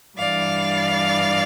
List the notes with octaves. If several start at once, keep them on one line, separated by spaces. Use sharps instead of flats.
G2 E3 D5 F5